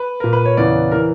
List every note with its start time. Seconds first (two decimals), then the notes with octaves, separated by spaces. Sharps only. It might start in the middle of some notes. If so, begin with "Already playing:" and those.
Already playing: B4
0.20 A#2 A#4
0.33 B4
0.46 C#5
0.57 E2 C#3 E3 D5
0.92 E3 A#4